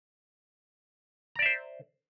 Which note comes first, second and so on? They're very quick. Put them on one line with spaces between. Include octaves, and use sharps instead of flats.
A#5 D5 E5 C5